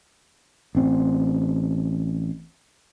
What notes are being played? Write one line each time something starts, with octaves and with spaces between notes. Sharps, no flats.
A1 C4